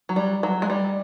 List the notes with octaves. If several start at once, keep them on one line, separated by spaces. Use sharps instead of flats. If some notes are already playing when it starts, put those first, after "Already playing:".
F#3
G3
F#3
G#3
G3